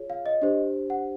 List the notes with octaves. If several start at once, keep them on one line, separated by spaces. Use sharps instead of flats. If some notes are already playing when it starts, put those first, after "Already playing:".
Already playing: F4 G#4 C#5
F5
D#5
D4 G4 C5
F#5